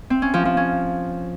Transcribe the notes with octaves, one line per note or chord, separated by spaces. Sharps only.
C4
C#4
F3
F3
C#4